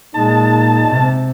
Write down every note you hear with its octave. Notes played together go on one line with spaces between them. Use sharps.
A#2 G#3 D#4 A5
C3